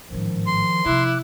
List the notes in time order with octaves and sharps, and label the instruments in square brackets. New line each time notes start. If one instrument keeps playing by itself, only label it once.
[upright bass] A1 G#2 [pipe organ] D#3 F3
[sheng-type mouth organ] C6
[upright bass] C3 F3 [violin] E4 [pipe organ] D6 F#6